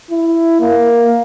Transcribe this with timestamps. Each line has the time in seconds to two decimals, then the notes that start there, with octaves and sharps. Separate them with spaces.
0.11 E4
0.60 A#3